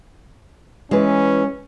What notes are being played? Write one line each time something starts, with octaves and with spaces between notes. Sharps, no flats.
E3 G#3 C#4 E4 B4